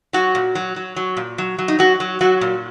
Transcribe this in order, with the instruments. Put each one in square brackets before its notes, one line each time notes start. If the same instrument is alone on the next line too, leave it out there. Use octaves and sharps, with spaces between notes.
[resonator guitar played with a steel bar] F#3 F#4
A#2
F#3
F#3
F#3
A#2
F#3
F#3
D#4
F#3 F#4
F#3
F#3 F#4
A#2